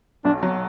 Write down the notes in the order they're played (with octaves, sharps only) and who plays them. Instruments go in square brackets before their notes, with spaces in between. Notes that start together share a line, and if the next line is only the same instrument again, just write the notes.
[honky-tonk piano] B1 [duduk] D4
[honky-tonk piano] F#3